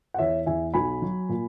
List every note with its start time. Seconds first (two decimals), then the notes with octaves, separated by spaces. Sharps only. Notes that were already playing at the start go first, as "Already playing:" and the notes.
0.14 F#5
0.19 E2 C#5 E5
0.46 E2 E5 G#5
0.74 B1 G#5 B5
1.02 F#3
1.29 A#2